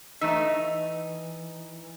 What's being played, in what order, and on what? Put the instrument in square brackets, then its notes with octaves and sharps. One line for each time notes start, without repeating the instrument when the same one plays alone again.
[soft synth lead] E3 [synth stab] A3 E5 [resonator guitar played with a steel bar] D#4